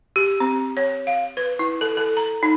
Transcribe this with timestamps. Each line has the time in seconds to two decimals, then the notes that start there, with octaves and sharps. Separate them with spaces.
0.16 G4
0.40 C4
0.77 C#5
1.07 F5
1.37 B4
1.59 E4
1.81 A4
1.97 A4
2.17 A#5
2.43 D#4